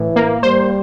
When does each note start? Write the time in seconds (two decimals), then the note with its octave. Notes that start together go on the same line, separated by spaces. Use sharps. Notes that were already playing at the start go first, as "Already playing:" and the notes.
Already playing: A2 E3
0.16 A#3
0.43 G3 C5